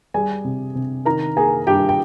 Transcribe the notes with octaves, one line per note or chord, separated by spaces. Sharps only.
G3 G#4 G#5
C3
C3
D#3 A#4 A#5
A#3 G#4 G#5
G2 G4 G5
G5